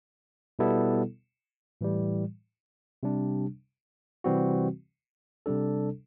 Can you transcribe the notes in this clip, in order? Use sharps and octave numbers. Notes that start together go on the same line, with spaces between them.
B2 G3 B3 E4 A4
A2 E3 G3
C3 G3 D4
C3 E3 G3 C4 F#4
C3 G3 D4 A4